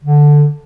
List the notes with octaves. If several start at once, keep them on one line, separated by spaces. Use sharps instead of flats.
D3